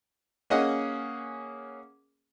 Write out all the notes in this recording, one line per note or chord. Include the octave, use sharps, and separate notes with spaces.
A#3 C#4 G#4 D#5 F#5